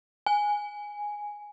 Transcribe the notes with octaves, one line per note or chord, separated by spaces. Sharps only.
G#5